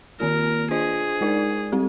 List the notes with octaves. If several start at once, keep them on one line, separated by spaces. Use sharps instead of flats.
D#3 A#3 F4 A#4
D4 F4 G#4 C5 D#5
G#3 D#4 A#4 D5
G3 C4 G4